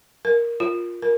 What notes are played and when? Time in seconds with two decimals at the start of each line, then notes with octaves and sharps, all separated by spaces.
0.25 A#4
0.60 F4
1.02 A#4